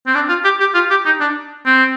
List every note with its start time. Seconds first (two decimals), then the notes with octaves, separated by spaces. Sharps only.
0.07 C4
0.15 D4
0.29 F4
0.44 G4
0.60 G4
0.74 F4
0.90 G4
1.05 D#4
1.20 D4
1.66 C4